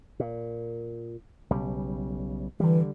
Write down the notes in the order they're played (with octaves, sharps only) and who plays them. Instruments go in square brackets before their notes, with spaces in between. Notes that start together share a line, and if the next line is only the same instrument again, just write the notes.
[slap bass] A#2
B1 C#3 G3
[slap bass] D3 G3 [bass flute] E3